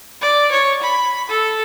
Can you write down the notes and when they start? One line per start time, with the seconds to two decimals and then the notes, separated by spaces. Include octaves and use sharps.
0.21 D5
0.51 C#5
0.82 B5
1.29 A4